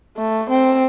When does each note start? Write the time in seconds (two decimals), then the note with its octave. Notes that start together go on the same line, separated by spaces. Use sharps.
0.17 A3
0.50 C4